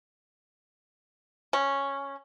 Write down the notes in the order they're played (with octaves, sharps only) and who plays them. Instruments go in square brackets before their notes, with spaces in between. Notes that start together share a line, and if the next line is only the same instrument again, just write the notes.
[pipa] C#4